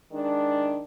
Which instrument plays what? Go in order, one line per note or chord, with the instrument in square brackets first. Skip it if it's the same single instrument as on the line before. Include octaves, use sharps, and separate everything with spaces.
[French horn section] D#3 G#3 D4